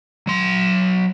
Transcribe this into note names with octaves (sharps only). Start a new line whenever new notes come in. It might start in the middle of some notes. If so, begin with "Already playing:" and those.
F#3 C6